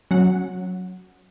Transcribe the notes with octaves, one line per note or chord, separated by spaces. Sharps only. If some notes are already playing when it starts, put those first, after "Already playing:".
F#3 C#4 F#5